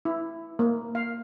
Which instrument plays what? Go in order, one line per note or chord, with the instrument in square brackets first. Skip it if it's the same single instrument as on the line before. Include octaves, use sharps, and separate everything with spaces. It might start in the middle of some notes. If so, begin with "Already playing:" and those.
[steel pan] E4
A#3
F5